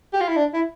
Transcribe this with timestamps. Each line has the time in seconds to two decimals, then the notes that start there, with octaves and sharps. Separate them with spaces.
0.13 G4
0.21 F4
0.28 E4
0.36 D4
0.54 E4